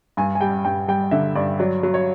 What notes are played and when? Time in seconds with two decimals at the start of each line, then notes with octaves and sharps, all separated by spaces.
0.17 G2 G#5
0.35 G#5
0.41 G3 G5
0.65 G2 G5
0.88 G3 G5
1.11 D3 E5
1.35 G2 D5
1.59 F#3 D5
1.83 F#3
1.94 C#5